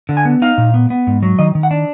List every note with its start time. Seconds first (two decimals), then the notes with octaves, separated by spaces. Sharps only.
0.09 D3
0.17 G#5
0.25 B3
0.42 D#4 F5
0.58 A#2
0.74 B3
0.90 B3
1.07 G#2
1.23 F#3
1.39 D#3 D#5
1.55 D#3
1.63 F#5
1.71 D4